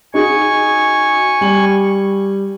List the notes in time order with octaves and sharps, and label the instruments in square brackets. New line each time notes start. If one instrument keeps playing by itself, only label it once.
[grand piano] D#4 F#4 G#4 [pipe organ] G#5 C#6
[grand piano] G3 F#7